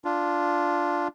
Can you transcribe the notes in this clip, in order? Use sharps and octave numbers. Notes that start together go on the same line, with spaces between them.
D4 F4